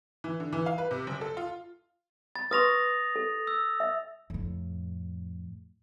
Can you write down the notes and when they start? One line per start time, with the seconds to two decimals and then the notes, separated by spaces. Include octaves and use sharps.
0.24 E3
0.40 D3
0.53 E3
0.66 F5
0.78 B4
0.91 C3
1.07 F#1
1.21 A4
1.37 F4
2.36 B5 A6
2.51 B4 C6 C#6 D#6 A#6 F7
3.16 A4
3.47 E6
3.80 E5
4.30 F2 A2